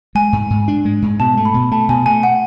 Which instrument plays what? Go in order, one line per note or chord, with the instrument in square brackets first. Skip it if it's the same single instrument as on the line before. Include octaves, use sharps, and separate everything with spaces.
[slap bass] G#3 [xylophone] G#5
[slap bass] G#2
G#2
D4
G#3
G#2
[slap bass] B2 [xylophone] A5
[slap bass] A3
[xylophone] B5
[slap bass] B2
[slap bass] A3 [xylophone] A5
[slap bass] B2 [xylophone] G#5
[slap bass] A3 [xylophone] G#5
[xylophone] F#5